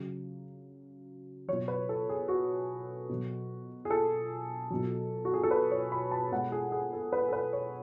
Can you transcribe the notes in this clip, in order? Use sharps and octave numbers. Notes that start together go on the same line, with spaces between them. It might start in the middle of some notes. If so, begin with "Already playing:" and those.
Already playing: C#3 F#3
B2 F#3 C#5
B4
A4
G#4
F#4
B2 F#3
G#4
A4
B2 F#3
F#4
G#4
A4
B4
C#5
B5
A5
B2 G#3 F#5
G#4
G#4
A4
B4
A4
B4
C#5